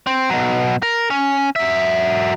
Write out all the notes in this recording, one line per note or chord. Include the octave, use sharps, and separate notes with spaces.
C4
B2 F#3
A#4
C#4
F#3 E5